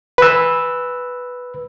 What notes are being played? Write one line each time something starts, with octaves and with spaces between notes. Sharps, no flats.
B4 E6